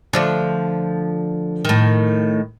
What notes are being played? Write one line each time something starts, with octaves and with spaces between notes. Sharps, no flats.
D3 F3 A3
A2 D#3